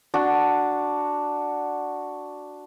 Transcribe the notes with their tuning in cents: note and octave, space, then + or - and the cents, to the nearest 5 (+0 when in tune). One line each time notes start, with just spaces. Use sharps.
D4 +0 F#4 +0